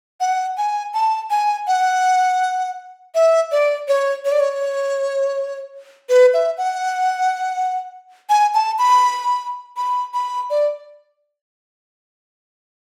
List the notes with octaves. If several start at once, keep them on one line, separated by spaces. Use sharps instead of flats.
F#5
G#5
A5
G#5
F#5
E5
D5
C#5
C#5
D5
C#5
B4
E5
F#5
G#5
A5
B5
B5
B5
D5